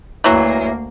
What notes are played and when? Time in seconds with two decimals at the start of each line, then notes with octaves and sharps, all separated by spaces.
0.24 D2 E3 F#3 A#3